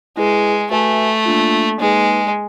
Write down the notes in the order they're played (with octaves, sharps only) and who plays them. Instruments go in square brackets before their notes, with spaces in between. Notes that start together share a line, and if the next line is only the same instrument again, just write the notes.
[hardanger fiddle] G#3 [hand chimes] E4 G#4 B4
[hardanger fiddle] A3 [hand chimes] F#4 B4 E5 G#5
[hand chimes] A#3 D4 F4
[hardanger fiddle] G#3 [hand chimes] A#3 D#4 G#4 B4